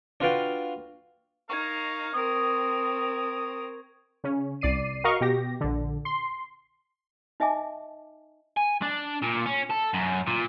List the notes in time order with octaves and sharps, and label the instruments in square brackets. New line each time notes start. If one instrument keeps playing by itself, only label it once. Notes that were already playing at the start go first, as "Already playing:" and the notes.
[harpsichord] D4 F4 F#4 B4 F5 G5
[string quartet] D#4 [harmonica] A#4 F5 [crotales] C#6 G#6
[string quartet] C4 A#4 [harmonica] D#6
[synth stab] C#3 C#4
C2 D5 C7 D#7
F#4 A#4 D#5 F5 C#6
B2 G4 A#6
A#1 D3
C6
[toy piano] D#4 D#5 E5 G#5 A5 D6
[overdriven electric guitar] G#5
D4
A#2
C#4
A4
F#2
A#2